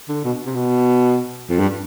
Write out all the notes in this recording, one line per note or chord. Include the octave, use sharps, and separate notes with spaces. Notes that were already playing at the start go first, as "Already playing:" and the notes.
D3
B2
C3
B2
F2
G2